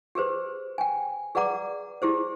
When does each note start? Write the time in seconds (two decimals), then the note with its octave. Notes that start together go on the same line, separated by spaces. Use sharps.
0.15 G4 G#4 B4 C5
0.78 G5 G#5
1.35 G#4 B4 D5 F#5 A#5 D6
2.02 E4 G4 G#4 C5